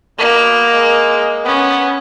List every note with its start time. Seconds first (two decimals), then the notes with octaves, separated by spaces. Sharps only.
0.18 B2 A#3
0.74 G#3
1.45 B3 C#4